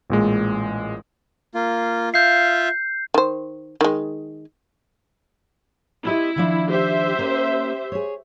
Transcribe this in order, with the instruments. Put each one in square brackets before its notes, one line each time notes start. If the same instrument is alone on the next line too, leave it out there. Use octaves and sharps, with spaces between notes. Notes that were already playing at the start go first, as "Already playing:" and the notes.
[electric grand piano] A1 A#2 G#3
[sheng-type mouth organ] A#3 F4
[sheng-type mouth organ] F4 E5 F5 [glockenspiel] G6 C7
[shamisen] D#3 C5
D#3 G#3
[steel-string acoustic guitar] C4 G4 D#5 [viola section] E4
[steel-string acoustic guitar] D#3 F3 D4
[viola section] G4 C5 E5
[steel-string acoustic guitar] A#3 C#4
G#4 C#5